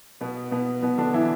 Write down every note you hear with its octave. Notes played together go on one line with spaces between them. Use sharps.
B2 B3
B2 B3
B2 B3
D3 D4
E3 E4